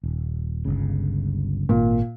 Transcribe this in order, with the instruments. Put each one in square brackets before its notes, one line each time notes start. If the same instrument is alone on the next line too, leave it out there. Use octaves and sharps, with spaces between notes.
[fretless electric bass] D#1
G1 C#2 C#3
[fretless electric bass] G#1 [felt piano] A#2